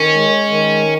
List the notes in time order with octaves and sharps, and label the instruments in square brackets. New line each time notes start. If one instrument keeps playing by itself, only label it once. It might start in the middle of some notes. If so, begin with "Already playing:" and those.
Already playing: [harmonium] D#3 [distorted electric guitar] C#4
[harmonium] G#3
D#3